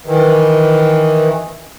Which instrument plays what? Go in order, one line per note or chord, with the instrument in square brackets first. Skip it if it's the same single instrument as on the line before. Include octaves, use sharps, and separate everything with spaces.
[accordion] D#3 E3